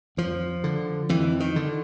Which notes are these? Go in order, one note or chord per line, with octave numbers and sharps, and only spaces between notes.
F2 F3
D3
F2 E3
D#3
D3